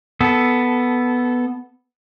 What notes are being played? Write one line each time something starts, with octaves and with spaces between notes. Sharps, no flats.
B3 A4